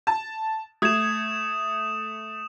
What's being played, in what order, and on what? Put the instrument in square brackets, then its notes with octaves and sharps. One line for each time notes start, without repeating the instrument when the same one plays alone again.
[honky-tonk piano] A5
[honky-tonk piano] A3 G#6 [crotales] D#6 E7